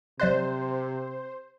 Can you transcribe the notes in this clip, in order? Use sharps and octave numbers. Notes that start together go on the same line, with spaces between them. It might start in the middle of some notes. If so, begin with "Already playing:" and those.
C3 F#3 C5 D5 F#6